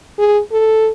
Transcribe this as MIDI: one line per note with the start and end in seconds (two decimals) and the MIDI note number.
0.19 0.40 68
0.52 0.90 69